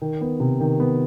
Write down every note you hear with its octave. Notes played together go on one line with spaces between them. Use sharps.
D#3
B3
C3
D#3
B3